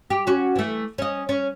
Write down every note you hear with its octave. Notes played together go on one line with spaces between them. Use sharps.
G4
C#4 F#4
E3 A3
C#4 D#5
C#4